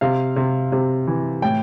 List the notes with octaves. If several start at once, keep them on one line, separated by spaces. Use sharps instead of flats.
C3 F5
C3
C3
E3
A2 G5